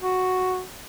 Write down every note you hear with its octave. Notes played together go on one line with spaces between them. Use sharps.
F#4